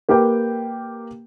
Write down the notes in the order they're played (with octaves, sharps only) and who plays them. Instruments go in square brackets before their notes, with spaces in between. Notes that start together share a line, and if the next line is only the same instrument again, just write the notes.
[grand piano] A#3 G4 A#4 B4 G5